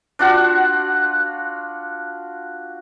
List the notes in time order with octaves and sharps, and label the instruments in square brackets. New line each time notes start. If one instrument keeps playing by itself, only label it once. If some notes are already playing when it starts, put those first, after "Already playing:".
[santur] D4 F4 F#4 F#5